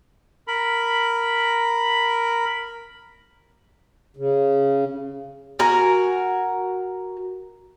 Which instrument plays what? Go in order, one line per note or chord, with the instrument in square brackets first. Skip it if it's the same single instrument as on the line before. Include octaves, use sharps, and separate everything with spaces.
[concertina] A#4 B5
[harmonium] C#3
[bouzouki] F#4 A#4 G#5